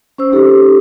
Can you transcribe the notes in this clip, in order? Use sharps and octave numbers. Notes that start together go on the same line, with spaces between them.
C#4 C5 E6
C#4 D#4 G4 A4